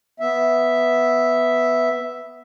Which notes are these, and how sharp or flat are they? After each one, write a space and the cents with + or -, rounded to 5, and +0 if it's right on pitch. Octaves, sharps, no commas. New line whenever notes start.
B3 +0 E5 +0